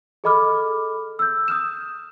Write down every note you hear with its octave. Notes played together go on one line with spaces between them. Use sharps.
G#4 A4 D#5 B5 D6 F6
E6 G6
D#6 F6 E7